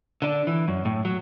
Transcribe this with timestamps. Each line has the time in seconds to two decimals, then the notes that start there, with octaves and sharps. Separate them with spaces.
0.22 D3 D4
0.47 E3
0.68 F#2
0.85 A2
1.05 F#3